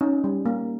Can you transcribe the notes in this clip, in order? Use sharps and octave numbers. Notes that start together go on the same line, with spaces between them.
C#4 D#4
G3
A#3